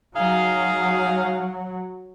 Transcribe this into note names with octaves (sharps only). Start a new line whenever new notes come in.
F#3 D#4 G#4 F5